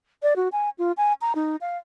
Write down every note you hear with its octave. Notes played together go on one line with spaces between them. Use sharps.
D5
F#4
G#5
F4
G#5
A#5
D#4
F5